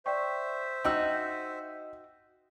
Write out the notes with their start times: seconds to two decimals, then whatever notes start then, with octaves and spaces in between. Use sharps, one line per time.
0.06 C5 D5 E5 G5 C#6
0.84 D#4 F#4 D#5 G5 E6